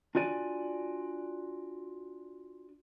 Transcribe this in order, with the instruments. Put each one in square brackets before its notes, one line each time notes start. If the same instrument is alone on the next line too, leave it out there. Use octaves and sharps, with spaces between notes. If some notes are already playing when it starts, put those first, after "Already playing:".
[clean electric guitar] D4 F4 F#4 D5 G#5